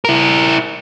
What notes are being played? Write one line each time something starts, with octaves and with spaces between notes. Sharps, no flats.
E4 A#4